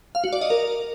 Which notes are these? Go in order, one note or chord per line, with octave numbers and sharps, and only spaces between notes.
F5
F#4
D5
D#5
A#4